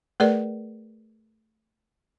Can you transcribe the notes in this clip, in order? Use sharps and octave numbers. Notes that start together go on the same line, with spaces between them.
A3 G#4 A#4 B4 D5